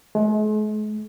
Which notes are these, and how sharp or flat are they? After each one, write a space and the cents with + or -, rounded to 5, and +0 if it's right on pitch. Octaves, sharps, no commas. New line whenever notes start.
G#3 +45